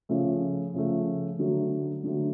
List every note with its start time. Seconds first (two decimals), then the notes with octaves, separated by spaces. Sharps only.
0.09 C#3 F3 A3
0.74 C#3 F3 A3
1.39 D3 F#3 A3
2.04 D3 F#3 A3